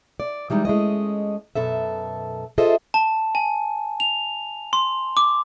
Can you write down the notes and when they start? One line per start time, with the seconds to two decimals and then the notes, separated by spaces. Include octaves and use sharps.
0.20 D5
0.50 E3 G3 G#3 D#4
0.65 G#3 A3 C#4 D#5
1.55 F#2 B2 A4 E5
2.58 F4 G#4 A4 C5 D#5 E5
2.94 A5
3.35 G#5
4.00 F7
4.73 C6
5.17 D6